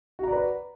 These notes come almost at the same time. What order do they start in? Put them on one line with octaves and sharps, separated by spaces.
F#4 A#5 D5 B4